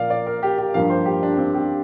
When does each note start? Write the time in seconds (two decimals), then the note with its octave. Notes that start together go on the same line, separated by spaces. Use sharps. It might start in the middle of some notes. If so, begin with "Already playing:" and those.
Already playing: A#2 F3 A#3 A#4 D5 F5
0.10 D5
0.27 A#4
0.43 G4
0.58 G4
0.74 G2 F3 A#3 F5
0.90 C5
1.06 G4
1.23 D4
1.38 C4
1.54 G4